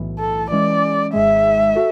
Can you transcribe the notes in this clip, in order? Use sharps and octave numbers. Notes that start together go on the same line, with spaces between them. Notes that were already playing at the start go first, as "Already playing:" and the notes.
Already playing: B1 A2 E3
A4
E3 G#3 C#4 D5
G#1 G#2 G#3 E5
F#4 A4